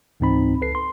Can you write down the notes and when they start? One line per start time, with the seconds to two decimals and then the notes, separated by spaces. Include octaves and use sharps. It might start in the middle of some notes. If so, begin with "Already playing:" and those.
0.20 C#2 G#2 E3 C4 D#4 B5
0.61 C#2 A4 B4 C7
0.75 C6